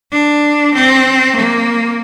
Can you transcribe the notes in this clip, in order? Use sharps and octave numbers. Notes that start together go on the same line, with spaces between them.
D4
C4
A#3